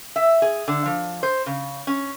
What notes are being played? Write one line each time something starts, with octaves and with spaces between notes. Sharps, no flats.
E5
G#4
D3
F3
C5
C#3
C#4